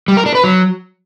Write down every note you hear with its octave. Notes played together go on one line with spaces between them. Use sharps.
G3
A#4
D4
B4
F#3